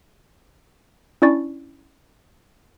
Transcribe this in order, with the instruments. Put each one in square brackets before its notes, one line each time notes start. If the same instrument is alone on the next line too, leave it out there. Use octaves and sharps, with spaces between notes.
[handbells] C#4 D4 E4 D5 C#6 A6